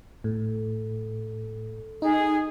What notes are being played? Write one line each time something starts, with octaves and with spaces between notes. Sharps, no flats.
A2 A4
D#4 G#4